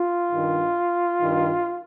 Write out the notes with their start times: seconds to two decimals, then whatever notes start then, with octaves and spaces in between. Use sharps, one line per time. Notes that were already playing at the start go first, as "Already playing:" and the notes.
Already playing: F4
0.32 G2 D#3
1.21 G2 D#3